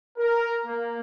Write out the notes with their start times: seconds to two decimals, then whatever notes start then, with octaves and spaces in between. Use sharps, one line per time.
0.18 A#4
0.66 A#3